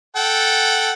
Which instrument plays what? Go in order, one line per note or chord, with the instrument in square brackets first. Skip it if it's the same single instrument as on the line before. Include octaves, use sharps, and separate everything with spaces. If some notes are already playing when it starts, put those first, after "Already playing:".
[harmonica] A4 F#5 G5